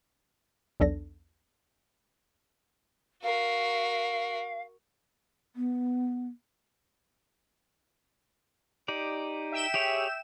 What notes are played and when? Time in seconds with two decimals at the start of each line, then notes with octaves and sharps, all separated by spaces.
0.80 B1 E2 D4 A4 D5 A#6
3.23 F#4 A#4 F5
5.56 B3
8.88 D#4 G4 D5
9.52 E5 G5 E7
9.74 G4 G#4 C#5